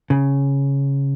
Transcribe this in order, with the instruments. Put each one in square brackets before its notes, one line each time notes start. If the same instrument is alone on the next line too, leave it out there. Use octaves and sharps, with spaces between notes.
[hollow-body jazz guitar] C#3